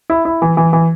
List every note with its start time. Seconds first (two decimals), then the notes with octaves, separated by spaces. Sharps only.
0.10 E4
0.25 E4
0.42 E3
0.57 E3
0.73 E3